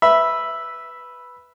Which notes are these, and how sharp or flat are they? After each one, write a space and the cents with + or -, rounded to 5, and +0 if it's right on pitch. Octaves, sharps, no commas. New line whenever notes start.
B4 +0 E5 +0 B5 -5